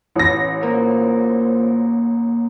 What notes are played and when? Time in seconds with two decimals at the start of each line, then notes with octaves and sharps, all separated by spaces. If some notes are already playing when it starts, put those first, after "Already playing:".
0.16 A1 A#6
0.63 A#3 F4 A#4 C5